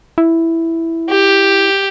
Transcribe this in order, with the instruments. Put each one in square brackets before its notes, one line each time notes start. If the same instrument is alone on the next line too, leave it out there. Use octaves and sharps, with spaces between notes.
[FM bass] E4
[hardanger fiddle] G4